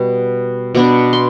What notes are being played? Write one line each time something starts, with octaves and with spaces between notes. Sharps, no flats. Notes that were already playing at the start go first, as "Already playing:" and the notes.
Already playing: B2 G3 B3
B2 B3 D4 D6
C6